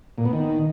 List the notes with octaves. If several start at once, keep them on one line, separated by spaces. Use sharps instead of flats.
A#2
B3
D#3